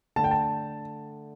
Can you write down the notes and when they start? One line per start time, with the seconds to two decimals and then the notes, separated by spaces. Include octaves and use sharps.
0.16 D3 A3 A5
0.24 G5
0.31 A5